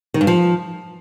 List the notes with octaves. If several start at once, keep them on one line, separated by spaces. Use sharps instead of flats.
D#3
G2
F3